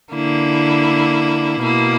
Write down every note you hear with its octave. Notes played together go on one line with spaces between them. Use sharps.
D3 A#3 E4
B2 A#3 E4